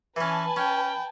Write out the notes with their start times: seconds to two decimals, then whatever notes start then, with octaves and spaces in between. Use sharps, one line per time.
0.16 E3 C#4 B4 G#5 A5 B5
0.56 C#4 G5